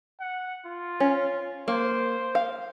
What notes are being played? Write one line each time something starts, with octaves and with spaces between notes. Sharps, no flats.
F#5
F4
C#4
A#3 C5
F5